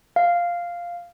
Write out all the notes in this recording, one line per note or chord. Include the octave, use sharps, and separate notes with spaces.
F5